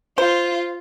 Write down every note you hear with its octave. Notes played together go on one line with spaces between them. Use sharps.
F4 C5